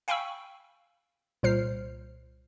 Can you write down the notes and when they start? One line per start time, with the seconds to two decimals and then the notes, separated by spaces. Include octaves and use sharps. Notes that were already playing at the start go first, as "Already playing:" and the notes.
0.08 F5 G5 G#5 B5 C#6 E6
1.43 C2 A#2 C5 F6 C7